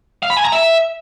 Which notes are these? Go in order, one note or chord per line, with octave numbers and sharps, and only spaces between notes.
F5
B5
G#5
A#5
E5